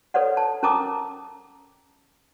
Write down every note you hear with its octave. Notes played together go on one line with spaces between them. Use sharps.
A4 B4 C#5 D5 F#5
A5
C#4 A#4 A5 A#5 D6 D#6